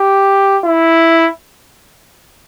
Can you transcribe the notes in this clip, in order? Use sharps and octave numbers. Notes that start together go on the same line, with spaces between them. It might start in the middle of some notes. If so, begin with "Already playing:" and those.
Already playing: G4
E4